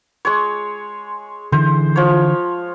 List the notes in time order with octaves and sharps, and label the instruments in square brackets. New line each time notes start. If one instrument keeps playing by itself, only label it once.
[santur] G#3 C#5
[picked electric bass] D3 E3 [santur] C5
[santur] F3 C#5